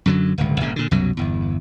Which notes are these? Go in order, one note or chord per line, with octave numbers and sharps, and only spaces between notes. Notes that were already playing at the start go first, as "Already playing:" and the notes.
F#2 D3 F#3
D1 G1 C#2
G1 A#2 C#3
A#2 D3
C2 F#2 B2 F#3
G1 E2